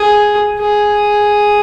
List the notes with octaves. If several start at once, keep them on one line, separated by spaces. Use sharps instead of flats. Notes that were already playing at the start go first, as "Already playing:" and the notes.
Already playing: G#4
G#4